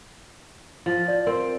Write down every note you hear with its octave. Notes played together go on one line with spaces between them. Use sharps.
F3
D5
C4 A#4